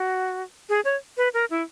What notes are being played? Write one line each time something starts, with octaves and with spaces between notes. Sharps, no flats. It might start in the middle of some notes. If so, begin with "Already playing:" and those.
Already playing: F#4
G#4
C#5
B4
A#4
E4